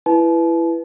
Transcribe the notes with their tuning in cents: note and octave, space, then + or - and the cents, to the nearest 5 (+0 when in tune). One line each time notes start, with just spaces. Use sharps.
E4 +20 B4 +0 A5 -40